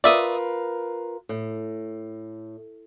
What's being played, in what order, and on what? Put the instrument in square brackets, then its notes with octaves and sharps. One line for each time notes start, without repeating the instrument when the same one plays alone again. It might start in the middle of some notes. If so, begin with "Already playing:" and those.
[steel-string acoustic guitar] F4 A#4 B4 [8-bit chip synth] D5 E5 D#6
[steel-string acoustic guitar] A2